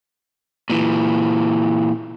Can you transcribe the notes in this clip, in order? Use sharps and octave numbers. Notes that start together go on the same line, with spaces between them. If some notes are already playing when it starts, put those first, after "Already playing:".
A#2 E3